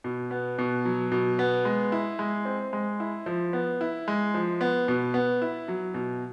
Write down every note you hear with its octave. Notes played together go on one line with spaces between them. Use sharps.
B2
B3
B2
F#3
B2
B3
G#3
E4
G#3
C4
G#3
E4
F3
B3
E4
G#3
F3
B3
B2
B3
E4
F#3
B2